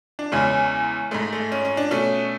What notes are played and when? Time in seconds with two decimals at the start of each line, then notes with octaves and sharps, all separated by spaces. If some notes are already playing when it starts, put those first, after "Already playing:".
0.19 D4
0.32 E2 C#3 G#3 C#4
1.11 G#2 G#3 A3
1.33 A3
1.52 C#4
1.65 C#4
1.77 D4
1.91 B2 A3 C#4